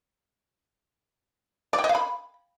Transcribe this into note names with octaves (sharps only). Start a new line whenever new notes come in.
D5
G5
D#5
F5
B5